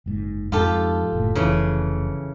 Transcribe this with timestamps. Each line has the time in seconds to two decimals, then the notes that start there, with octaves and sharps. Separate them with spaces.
0.06 F#1 G#2
0.52 F2 G#2 F4 G4 A4
1.13 F#1 A2
1.35 F1 C#3 E3